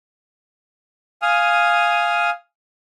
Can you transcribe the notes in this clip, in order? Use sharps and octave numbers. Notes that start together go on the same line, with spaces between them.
F5 G#5 D#6 F6